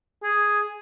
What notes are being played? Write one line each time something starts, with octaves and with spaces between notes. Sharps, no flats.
G#4